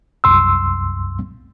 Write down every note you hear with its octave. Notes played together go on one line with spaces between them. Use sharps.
C2 F#2 C6 E6